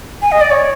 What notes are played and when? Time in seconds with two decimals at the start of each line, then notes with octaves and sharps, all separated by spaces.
0.22 G#5
0.32 D#5
0.41 D5
0.51 C#5